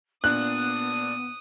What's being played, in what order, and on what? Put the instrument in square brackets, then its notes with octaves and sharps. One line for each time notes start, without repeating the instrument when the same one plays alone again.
[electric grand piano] A#2 D4 [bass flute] B3 [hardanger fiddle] D#6 [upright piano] F#6